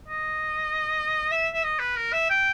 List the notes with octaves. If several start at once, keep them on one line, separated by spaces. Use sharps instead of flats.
D#5
E5
E5
D#5
B4
A#4
E5
G5